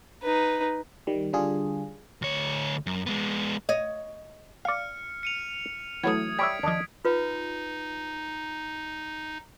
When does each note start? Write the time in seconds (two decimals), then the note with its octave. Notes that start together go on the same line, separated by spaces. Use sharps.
0.22 D#4 B4
1.07 D#3 G3
1.33 D3 G3 D4 F4 G#4
2.22 D2 C#5
2.87 F#2
3.06 G#3 B3
3.69 C#5 D#5
4.65 D5 F5 F6 C#7
5.23 C#7 D#7 F7
6.03 E3 F#3 A3 B3 D#6 G#6
6.39 G3 C#5 E5 G#6 B6 D7
6.63 D#2 F3 D4 D#5
7.05 D#4 F4 B4